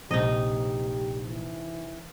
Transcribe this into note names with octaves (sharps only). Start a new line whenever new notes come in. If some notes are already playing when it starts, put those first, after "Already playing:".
A#1 C3 D#4 G4 D#5
E3